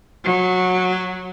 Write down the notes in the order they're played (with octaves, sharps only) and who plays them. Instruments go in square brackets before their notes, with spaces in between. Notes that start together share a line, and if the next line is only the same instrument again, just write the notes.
[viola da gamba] F#3